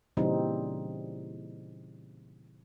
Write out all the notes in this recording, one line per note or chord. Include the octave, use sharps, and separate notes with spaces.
A#2 C#3 E3 G3 C4 D#4